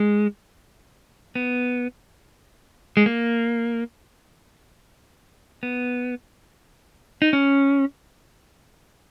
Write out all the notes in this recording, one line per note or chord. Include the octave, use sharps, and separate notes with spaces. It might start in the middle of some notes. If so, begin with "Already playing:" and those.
Already playing: G#3
B3
G#3
A#3
B3
D#4
C#4